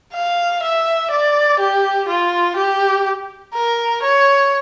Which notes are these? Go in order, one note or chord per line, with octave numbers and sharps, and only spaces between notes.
F5
E5
D5
G4
F4
G4
A#4
C#5